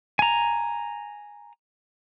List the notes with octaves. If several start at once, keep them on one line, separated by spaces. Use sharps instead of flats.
G#5 A#5